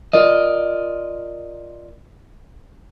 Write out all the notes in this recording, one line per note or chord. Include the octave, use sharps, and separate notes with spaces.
F4 A#4 D5 D#5